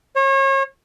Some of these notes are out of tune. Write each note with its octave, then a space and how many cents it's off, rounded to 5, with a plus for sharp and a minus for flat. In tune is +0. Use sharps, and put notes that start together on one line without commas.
C#5 -35